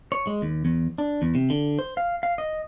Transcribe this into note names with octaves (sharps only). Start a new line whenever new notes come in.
C#5
G#3
D#2
E2
D4
E2
C3
D3
C5
F5
F5
D#5